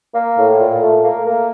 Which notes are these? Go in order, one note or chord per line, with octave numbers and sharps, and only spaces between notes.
A#3
A2
A#2
A3
A#3
A#3